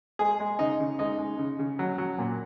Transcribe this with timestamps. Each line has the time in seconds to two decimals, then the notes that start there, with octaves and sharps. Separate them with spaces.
0.19 G#3 G#4
0.40 G#3
0.59 C#3 D#4
0.80 C#3
0.99 G#3 D#4
1.18 G#3
1.39 C#3
1.59 C#3
1.79 F#3
1.98 F#3
2.18 A#2